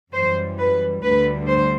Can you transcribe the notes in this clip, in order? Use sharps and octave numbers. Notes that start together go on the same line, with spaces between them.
F#2 E3 G3 C5
B4
D2 D3 G3 B4
C5